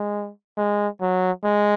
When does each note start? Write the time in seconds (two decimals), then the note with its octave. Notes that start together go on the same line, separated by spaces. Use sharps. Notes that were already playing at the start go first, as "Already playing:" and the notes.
Already playing: G#3
0.57 G#3
1.01 F#3
1.44 G#3